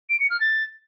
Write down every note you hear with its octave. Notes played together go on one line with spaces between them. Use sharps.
D7
C#7
F6
A6